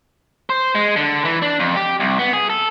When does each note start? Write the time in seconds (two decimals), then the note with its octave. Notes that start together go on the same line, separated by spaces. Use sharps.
0.50 C5
0.75 G#3
0.96 D3
1.25 E3
1.42 D4
1.60 F2
1.76 G4
2.00 C2
2.19 B3
2.33 G#4
2.50 A4